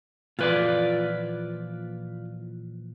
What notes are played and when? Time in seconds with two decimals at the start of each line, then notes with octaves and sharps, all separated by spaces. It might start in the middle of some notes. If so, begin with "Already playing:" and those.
0.39 A#2 E3 F3 F4 B4 D5